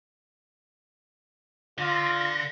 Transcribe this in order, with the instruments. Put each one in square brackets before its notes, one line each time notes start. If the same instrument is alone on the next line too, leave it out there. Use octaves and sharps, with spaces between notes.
[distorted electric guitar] D3 [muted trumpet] F4 [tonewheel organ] A#6